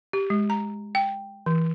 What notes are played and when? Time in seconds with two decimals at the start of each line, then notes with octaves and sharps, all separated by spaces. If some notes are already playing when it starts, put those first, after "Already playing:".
0.13 G4
0.30 G#3
0.50 A#5
0.95 G5
1.46 E3